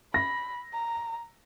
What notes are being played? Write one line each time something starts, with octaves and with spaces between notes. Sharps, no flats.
B5 A#6
A#5